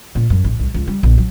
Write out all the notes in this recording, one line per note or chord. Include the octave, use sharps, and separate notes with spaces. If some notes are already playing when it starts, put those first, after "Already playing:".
A#2
F#2
A1
C2
C#2
G3
A#1
F#3